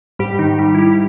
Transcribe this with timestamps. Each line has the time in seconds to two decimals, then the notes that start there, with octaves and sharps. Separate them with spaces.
0.19 G#2 G3 G4
0.39 D#3 D#4
0.46 G#2
0.59 G3 G4
0.72 D#3 E4
0.79 G3 G4